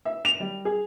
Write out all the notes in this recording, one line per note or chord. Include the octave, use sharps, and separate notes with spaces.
E5
F7
G3
G#4